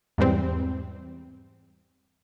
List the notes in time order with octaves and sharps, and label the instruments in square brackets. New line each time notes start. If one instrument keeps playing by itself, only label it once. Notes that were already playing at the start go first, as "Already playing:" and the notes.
[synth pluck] E2 G#2 E3 G3 C4